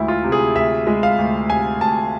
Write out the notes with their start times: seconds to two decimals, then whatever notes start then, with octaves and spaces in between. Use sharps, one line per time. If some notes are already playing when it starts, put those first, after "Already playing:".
Already playing: D2 G#3 E4
0.08 F4
0.24 C3
0.32 G#4
0.56 D2 E5
0.87 G#3
1.03 F5
1.18 D2
1.50 C3 G#5
1.81 D2 A5